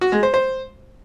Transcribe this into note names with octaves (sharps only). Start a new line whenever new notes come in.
F#4
G#3
C5
C5